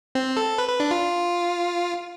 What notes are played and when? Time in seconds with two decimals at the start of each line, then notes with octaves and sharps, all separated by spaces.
0.15 C4
0.37 A4
0.58 B4
0.69 B4
0.80 D4
0.91 F4